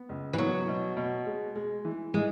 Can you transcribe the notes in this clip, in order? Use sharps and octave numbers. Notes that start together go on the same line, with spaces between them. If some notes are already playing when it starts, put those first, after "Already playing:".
Already playing: B3
C#2
E3
F#3 B3
B2
B2
G#3
G#3
E3
E3 G#3